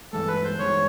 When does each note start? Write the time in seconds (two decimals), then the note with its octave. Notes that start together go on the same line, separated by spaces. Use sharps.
0.12 G2 E3 G#3 A4
0.28 B4
0.44 C5
0.59 G2 E3 G#3 C#5